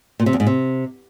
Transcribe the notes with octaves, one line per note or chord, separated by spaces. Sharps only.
A#2
C3
E2
G#2
C3